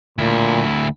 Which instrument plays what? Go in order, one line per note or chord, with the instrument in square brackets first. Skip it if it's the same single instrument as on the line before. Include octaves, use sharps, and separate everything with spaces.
[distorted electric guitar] D2 E4 [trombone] A#2